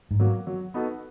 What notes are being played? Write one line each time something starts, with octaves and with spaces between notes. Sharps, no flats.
G#2
F#3 A#3
F#3
B3 D#4 F#4 A4